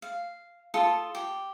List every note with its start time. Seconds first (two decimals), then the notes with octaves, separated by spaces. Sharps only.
0.02 F5
0.74 F4 A4 C6 D#6
1.15 G4